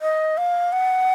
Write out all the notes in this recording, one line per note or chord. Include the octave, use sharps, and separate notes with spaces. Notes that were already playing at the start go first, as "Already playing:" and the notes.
D#5
F5
F#5